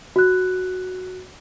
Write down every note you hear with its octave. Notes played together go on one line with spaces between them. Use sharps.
F#4 F#6